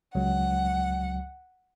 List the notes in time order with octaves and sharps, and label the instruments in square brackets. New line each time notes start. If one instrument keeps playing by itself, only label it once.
[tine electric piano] C#2 F#3 [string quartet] F#5